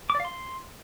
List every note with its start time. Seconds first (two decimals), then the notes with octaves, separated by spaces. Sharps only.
0.10 D6
0.15 D5
0.20 F5
0.25 C6